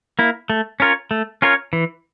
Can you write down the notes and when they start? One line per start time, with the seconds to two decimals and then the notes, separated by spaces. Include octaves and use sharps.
0.19 A#3 E4
0.50 A3
0.80 C#4 F4 A#4 C#5
1.11 A3
1.42 C#4 F4 A#4 C#5
1.73 E3